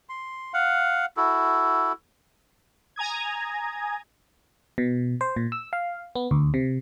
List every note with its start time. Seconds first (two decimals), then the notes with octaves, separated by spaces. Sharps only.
0.09 C6
0.54 F5 F#5
1.17 E4 F#4 A4
2.96 G#5 A#5 D#6 G#6
4.78 B2
5.21 C5
5.36 A#2
5.52 E6
5.73 F5
6.15 B3
6.31 D2
6.54 C3